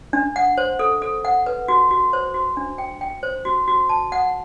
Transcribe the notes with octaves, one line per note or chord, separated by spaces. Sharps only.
D4
F#5
C5
A4
A4
F#5
B4
F#4
F#4
C5
F#4
D4
G5
G5
C5
F#4
F#4
A5
F#5